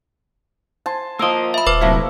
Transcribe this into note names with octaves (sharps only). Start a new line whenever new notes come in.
C5 G#5 A5
F3 A#3 A#4 D#5 E6
E5 B5
D#1 B4 C5 D6
C3 F#3 A3 A#3 E4 A4